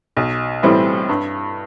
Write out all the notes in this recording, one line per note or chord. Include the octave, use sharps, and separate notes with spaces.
B1
A2 E3 G3 C4
G2